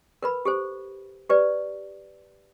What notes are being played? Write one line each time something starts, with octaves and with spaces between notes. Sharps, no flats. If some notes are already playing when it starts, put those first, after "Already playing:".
A#4 B4 B5
G4 A4 C5
G4 B4 D5